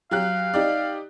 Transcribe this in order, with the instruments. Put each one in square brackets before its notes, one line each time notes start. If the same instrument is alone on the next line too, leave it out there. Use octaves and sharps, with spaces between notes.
[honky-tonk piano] F#3 G4 F#6 [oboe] F5
[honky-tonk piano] D#4 G4 D5